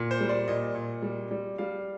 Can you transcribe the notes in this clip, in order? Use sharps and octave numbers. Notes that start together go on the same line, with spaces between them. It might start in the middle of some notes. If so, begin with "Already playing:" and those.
Already playing: A#2
C5
G3
D5
A#2 D#5
A#2
G3
G3
G3 F5